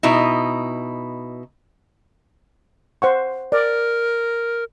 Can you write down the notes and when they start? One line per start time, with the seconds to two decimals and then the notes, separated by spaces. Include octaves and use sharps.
0.03 B2 D#4 E4
3.02 C5 F#5 C#6
3.52 A#4 D5